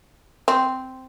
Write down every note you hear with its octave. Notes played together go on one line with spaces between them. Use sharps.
C4